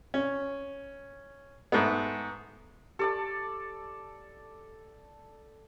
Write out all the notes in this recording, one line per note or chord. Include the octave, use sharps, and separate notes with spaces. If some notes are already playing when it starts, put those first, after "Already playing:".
C#4
G#2 A3 B3
G4 A4 D5 A5